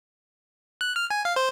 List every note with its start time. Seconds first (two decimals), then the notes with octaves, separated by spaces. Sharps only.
0.81 F#6
0.96 F6
1.11 G#5
1.25 F5
1.36 C5